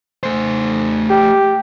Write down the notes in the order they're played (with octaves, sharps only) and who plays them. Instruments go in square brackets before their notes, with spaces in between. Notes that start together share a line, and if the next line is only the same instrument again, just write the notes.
[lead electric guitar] A3 C5
[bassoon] G4